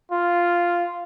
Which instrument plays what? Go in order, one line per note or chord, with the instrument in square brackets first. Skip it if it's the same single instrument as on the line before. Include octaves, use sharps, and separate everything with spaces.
[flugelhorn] F4